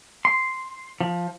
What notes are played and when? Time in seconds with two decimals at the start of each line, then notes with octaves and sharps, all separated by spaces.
0.25 C6
1.01 F3